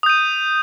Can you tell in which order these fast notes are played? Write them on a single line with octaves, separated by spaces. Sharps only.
D#6 G6 D#7